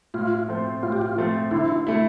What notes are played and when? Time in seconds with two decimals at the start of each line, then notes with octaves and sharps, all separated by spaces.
0.14 A2 F4
0.48 F3 A3 C4
0.83 A2 F4
0.92 G4
1.01 F4
1.18 F3 A3 C4
1.51 D3 E4
1.87 A3 E4